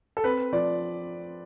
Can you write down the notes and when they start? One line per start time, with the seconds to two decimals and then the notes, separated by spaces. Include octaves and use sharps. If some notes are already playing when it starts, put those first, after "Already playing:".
0.17 A4
0.24 C4 B4
0.53 F3 D5